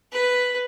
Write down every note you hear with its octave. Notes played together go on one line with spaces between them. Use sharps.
B4